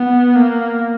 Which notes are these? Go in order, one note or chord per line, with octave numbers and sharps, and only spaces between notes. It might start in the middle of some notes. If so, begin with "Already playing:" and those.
Already playing: B3
A#3